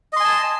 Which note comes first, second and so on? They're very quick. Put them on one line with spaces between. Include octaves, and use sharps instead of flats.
D#5 C6 G#5 A5